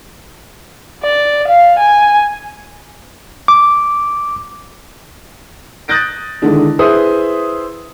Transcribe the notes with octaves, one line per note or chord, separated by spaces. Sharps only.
D5
F5
G#5
D6
D#6 F#6 G6 A6 A#6 D7
D3 D#3 G#3 D4 E4
E4 G#4 B4 C5 E5 D#6